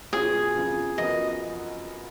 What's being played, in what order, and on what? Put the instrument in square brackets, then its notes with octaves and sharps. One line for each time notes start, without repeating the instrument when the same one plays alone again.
[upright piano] B2 F#3 C#4 F4 [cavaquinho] G#4
[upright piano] F2 C#3 F3
[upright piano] F#2 F3 B3 F#4 A#4 [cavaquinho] D#5